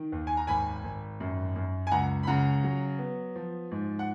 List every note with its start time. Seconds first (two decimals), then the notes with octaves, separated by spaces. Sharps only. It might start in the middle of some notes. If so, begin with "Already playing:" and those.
Already playing: D#3
0.12 D#2
0.27 G#5
0.37 A#5
0.47 G#1 G#5 B5
0.84 G#1
1.20 F#2
1.56 F#2
1.87 G#5
1.91 C#2 F#5 A#5
2.23 B5
2.27 C#3 F#5 A#5
2.64 F#3
2.99 B3
3.36 F3
3.71 G#2
3.99 F#5